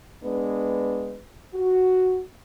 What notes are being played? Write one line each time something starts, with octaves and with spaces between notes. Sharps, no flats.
G#3 B3 D4 B4
F#4